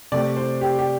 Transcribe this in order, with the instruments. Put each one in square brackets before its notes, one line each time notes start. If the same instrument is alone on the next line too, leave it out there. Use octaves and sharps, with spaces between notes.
[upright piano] C3 A3 C4 D5
C5
G4
G4